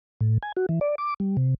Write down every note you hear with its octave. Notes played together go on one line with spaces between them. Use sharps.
A2
G#5
F#4
E3
D5
D6
G3
C3